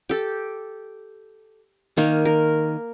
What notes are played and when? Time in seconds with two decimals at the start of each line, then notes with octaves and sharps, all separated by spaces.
0.09 G4 A4
1.98 D#3 A#3
2.25 A#4